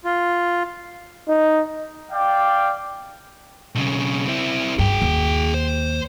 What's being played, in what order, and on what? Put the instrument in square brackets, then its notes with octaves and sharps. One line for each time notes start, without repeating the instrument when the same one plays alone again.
[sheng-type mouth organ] F4
[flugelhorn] D#4
[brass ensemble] D5 F5 G5
[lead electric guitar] B1 C#3
C4 E4
[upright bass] G2 [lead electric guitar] G#4 G5
[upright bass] D#2
[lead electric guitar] C5